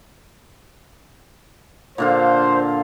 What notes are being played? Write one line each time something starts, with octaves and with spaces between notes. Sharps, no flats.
A#2 D3 F4 C5